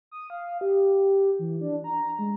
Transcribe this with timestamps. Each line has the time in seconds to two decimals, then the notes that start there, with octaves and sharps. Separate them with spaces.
0.11 D#6
0.30 F5
0.61 G4
1.39 E3
1.61 D4
1.84 A#5
2.18 G#3